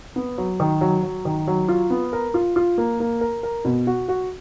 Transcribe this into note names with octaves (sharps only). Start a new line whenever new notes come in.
B3
F#3
D#3
F#3
F#3
D#3
F#3
F4
B3
A#4
F4
F4
A#3
A#3
A#4
A#4
B2
F#4
F#4